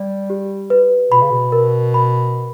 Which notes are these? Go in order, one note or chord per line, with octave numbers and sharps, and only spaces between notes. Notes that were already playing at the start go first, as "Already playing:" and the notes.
Already playing: G3 D5
G4
B4
B2 B5
C#3
B2
A#4
B5